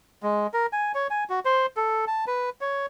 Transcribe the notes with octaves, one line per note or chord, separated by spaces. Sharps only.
G#3
A#4
G#5
C#5
G#5
F#4
C5
A4
A5
B4
C#5